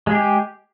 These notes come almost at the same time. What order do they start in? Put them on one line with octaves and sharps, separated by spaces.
G#3 G#4 G4